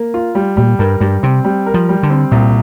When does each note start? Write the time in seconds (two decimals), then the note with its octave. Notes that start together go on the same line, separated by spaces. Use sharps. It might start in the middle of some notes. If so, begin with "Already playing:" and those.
Already playing: A#3
0.14 F4
0.35 G3
0.57 A#2 G3
0.79 G2 A#4
1.00 G2 G3
1.23 C3 C4
1.44 G3
1.66 A#4
1.74 F3
1.89 G3
2.03 D3
2.10 C4
2.31 C2 A#2